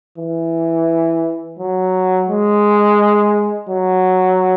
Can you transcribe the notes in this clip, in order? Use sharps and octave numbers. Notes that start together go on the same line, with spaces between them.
E3
F#3
G#3
F#3